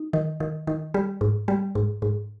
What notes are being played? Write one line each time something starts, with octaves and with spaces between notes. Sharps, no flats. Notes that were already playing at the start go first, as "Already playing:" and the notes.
Already playing: D#4
D#3
D#3
D#3
G3
G#2
G3
G#2
G#2